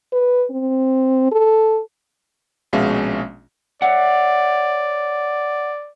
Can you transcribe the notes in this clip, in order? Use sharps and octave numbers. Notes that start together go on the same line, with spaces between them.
B4
C4
A4
A#1 B2 G#3 C#4 E5 F5
C#5 D5 E5 F#5